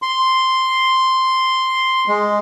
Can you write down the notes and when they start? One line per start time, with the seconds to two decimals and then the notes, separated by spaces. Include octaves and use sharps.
0.02 C6
2.08 G#3